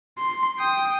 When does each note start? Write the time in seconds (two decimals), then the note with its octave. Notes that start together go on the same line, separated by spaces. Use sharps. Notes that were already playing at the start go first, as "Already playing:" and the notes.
0.19 C6
0.59 G5 D#6